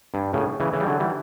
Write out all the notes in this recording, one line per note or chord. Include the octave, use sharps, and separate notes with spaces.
G2
A2 C#3
C#3 E3
C#3 E3
G3
D3 F#3
E3 G3